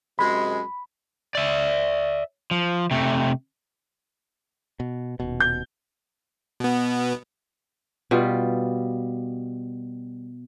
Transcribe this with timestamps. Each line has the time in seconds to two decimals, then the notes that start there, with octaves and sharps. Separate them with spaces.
0.19 F#2 C3 G#3 B5
1.35 D5 E5
2.51 F3
2.91 C3 A3
4.80 B2
5.20 D#1 B2
5.40 G6
6.60 B2 B3
8.11 B2 G3 F4 G4